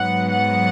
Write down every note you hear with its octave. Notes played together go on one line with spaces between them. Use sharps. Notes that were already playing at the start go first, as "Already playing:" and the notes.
Already playing: G#2 F#3 B3 F#5
F#5